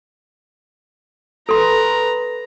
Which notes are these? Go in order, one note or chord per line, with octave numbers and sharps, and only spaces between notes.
A4 B4 A#5 C6